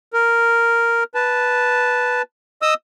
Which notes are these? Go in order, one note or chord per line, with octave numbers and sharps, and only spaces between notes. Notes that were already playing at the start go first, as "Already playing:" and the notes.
A#4
B4 A5
D#5 D#6 E6